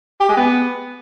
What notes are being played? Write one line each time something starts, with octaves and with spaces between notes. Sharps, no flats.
G4
G#3
B3